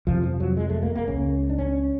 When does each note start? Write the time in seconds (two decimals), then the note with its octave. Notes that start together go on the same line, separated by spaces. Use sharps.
0.07 F2 C3 F3
0.24 F3
0.40 F#3
0.57 G#3
0.70 A3
0.83 A#3
0.95 A#3
1.08 C#2 C#3 C#4
1.50 D4
1.58 C#4